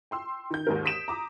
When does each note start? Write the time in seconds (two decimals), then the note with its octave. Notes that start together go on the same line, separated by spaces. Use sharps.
0.11 G5 C6 E6
0.51 D#3 G6
0.67 D#2 G#2 A#4
0.85 D#6 B6 D7 E7
1.08 A#5 D6 D#6